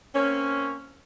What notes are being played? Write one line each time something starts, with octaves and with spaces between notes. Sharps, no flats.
A#3 C4 C#4